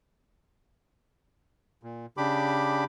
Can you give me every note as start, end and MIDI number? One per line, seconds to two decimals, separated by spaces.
1.83 2.06 46
2.17 2.84 49
2.17 2.84 62
2.17 2.84 67
2.17 2.84 83
2.17 2.84 86